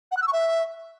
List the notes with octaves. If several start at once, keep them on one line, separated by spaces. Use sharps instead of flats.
F#5
F#6
E6
C#6
E5